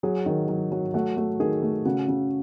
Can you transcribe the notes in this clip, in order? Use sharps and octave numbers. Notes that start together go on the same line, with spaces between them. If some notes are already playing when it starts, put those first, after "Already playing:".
F#3 G#4
D#3
F#3
F#3
A3 F#4
A3
D#3 G#4
A3
C#3 F#4
C#3